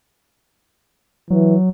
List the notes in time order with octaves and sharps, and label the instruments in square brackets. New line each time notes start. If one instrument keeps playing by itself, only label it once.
[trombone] E3 [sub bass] F#3